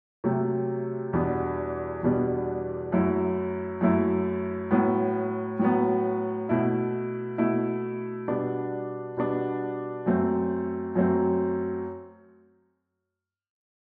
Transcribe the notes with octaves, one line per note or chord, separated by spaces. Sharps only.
C3 F#3 A3
E2 B2 G3 B3 D4
E2 B2 G3 B3 D4
F#2 F#3 A3 E4
F#2 F#3 A3 E4
A2 F#3 B3
A2 F#3 B3
B2 A3 E4
B2 A3 E4
B2 G3 B3 D4
B2 G3 B3 D4
F#2 F#3 A3 C4
F#2 F#3 A3 C4